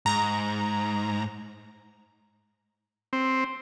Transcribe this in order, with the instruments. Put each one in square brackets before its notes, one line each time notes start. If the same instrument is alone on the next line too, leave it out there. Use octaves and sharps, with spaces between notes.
[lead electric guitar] G#2 [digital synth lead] A#5
[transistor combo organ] C4